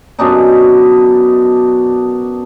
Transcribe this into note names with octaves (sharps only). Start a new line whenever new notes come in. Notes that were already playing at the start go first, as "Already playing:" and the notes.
F#2 B2 D4 D#4